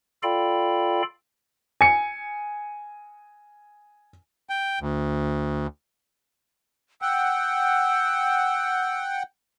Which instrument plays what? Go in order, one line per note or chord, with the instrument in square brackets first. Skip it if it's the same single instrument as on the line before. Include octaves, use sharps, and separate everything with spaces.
[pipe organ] F4 A4 D5 F5 G5 B5
[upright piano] G#5 C#7
[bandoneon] G5
D2
[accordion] F#5 G5 [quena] E6